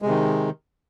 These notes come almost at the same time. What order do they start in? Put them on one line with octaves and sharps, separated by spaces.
G#3 C3 D#3